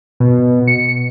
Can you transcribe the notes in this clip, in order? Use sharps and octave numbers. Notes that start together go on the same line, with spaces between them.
B2
C#7